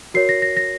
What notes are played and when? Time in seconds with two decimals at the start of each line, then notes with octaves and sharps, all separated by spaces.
0.14 F#4 A#4 C#5 C7
0.29 A#6
0.42 A#6
0.57 A#6